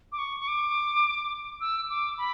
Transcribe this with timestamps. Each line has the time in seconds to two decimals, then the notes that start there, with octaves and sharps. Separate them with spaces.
0.12 D6
0.18 C#6
0.39 C#6
0.48 D6
1.61 E6
1.89 D6
2.18 B5